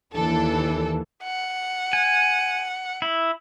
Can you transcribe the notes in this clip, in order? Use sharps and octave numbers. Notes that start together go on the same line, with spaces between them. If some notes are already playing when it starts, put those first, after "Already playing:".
D#2 E3 D4 A4
F#5
G#5
E4